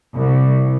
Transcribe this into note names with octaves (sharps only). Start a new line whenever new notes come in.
C2